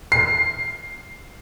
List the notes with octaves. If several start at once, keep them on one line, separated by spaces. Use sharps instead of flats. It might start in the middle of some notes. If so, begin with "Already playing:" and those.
C7